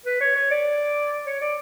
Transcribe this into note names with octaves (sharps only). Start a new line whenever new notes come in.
B4
C#5
C#5
D5
C#5
D5